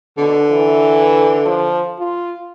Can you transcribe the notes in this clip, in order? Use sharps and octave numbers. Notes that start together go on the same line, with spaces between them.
B2 D3
E3
F3
F4